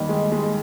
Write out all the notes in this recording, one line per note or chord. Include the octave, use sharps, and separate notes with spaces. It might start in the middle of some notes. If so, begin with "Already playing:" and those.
Already playing: D#2 D#3 G3
G#3
G#3